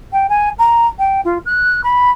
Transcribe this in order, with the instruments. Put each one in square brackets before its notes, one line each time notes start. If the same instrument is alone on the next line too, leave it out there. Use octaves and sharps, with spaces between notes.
[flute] G5
G#5
A#5
G5
F4
F#6
B5